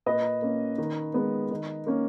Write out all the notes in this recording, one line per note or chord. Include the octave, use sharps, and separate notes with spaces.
A#2 B4 D#5
A#3 C#4
D#3
G#3 B3
D#3
A#3 C#4